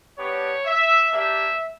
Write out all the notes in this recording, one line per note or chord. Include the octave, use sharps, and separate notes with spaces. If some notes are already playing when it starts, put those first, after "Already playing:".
B3 D4 G4 C#5
E5
A#3 D4 G4 E5